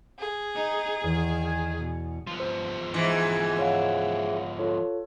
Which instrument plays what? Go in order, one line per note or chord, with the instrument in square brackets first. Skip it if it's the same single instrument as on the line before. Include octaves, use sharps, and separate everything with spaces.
[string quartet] G#4
[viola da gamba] D#4
[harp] E2 [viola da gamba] D#3
[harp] G#5 G#6
[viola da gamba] B2
[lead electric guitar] F3 B3
[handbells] C5
[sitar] G#2 E3
[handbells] C#5 F5 F#5
F4 A4 C#5